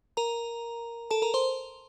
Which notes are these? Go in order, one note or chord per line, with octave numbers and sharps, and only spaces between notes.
A#4 A#5
A4 A5
A#4 A#5
C5 C6